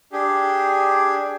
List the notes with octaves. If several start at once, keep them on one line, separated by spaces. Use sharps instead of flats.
D4 G4 G#4